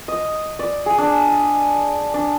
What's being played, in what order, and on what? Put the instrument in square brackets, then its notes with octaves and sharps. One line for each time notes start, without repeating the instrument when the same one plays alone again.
[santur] D#5
D5
G#4
D4
D4